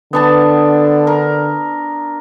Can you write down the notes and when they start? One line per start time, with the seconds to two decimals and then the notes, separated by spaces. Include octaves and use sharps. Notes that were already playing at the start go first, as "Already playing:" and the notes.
0.13 D3 B3 D4 A5
1.07 A#4